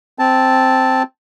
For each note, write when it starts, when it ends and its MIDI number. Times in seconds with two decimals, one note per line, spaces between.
0.19 1.03 60
0.19 1.03 81